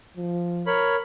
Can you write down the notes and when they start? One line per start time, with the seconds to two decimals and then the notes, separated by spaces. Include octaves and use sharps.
0.17 F3
0.67 A#4 C#5 B5